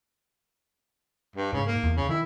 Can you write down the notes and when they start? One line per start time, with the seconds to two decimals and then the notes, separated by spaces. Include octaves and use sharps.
1.36 G2
1.53 G#2 C#3
1.67 A#3
1.83 E2
1.96 C#3
2.09 D#3 E4